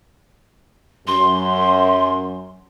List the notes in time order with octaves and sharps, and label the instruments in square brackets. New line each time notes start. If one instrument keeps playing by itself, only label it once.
[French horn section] F#2 [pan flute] C6